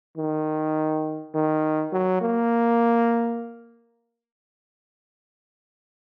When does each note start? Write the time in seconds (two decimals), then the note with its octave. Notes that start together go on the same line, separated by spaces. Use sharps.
0.18 D#3
1.34 D#3
1.93 F#3
2.21 A#3